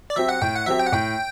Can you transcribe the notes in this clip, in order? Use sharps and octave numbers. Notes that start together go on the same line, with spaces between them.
D5
F#3 C4 G4 E5
F#5
A2 G5
F#5
F#3 C4 G4 E5
G5
F#5
A2 G5